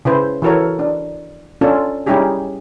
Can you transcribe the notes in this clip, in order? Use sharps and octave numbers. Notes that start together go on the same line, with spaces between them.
C#3 E4 B4 C5
E3 F#4 A4 A#4 C#5
D4
C#4 D4 F4 A4
G3 C#4 D#4 E4 G4 G#4